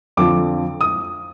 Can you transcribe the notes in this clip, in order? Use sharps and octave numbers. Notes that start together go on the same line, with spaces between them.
F2 D3 F3 D6
D#6